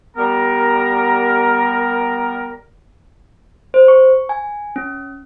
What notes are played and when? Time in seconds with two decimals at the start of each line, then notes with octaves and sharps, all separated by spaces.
0.17 G3 B3 A#4
3.74 C5
3.88 C#6
4.29 G#5
4.76 C#4